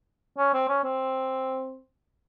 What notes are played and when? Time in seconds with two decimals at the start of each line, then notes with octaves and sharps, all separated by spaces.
0.38 C#4
0.54 C4
0.69 C#4
0.84 C4